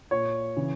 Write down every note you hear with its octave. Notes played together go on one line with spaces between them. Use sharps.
A#2 C#5
C#3 E3